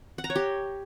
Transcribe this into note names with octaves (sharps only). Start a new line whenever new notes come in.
F#5
A#5
C#5
G4